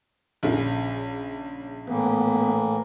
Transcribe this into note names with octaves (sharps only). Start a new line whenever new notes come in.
A#1 C#3
A2 E3 A#3 B3